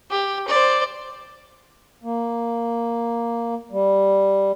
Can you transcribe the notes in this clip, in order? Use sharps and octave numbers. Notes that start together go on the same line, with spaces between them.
G4
C5 D5
A#3
G3